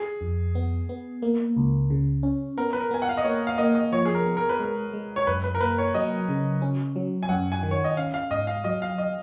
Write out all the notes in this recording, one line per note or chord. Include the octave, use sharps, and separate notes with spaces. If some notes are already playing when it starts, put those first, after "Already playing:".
Already playing: G#4
F2
B3
B3
A#3
C#2
C#3
C#4
B3 A#4
B4
A#4
B3 G#5
F#5
F5
D#5
A#3 C#5
F5
A#3 D#5
D#5
F3 C#5
G#4
A#4
B3
A#4
B4
G#3 A#4
G#3
C#5
F#2 B4
B4
A#4
A#3 B4
C#5
F#3 D#5
C#3
C#4
F#3
G#5
F#2 F#5
G#5
D#3
C#5
D#5
C#4 F5
F5
G#2 D#5
F5
F#3 D#5
F5
D#5